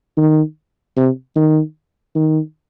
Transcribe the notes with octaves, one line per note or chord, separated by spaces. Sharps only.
D#3
C3
D#3
D#3